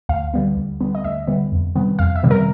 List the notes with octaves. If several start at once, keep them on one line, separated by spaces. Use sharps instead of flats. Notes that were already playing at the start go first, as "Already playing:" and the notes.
D2 F5
D3 G3 B3
D2
D3 G3 B3
D#5
D2 E5
D3 G3 B3
F2
C3 D#3 G3 B3
F2 F5
E5
C3 D#3 G3 B3
A#4